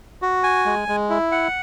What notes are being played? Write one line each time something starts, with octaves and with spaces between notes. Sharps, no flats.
F#4
G#5
G#3
G#3
E4
F#5